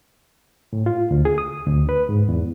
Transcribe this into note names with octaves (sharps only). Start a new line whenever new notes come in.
A2
F4
D2
G#4
D#6
D2
B4
G#2
E2